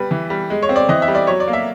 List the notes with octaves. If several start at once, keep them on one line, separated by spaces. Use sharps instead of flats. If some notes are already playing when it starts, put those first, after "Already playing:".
Already playing: G3 B4
E3
G3
G#3
C#5
C4
D5
E3 D#5
E5
G3
D5
F#3 C#5
D5
A#3
E5